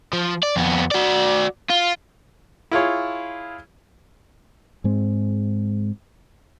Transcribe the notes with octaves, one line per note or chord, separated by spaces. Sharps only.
F3
D5
F2 B3
F#4 D5
F4
E4 F4 G#4 C#5
G#2 G#3 C4